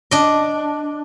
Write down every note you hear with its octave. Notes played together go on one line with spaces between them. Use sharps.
D4 D#5